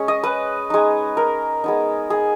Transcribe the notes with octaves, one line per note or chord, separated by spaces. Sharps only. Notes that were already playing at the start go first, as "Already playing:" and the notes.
Already playing: G#3 C#4
D#5
B4
G#3 D#4
A#4
G#3 B3 D#4
G#4